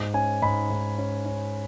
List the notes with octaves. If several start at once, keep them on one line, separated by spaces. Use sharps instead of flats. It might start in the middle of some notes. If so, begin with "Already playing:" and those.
Already playing: G#2
C#4 G#5
G#2 B5
G#2
C#4
C#4